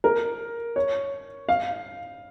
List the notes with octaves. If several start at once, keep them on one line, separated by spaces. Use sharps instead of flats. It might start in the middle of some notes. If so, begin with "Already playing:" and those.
A#4
C#5
F5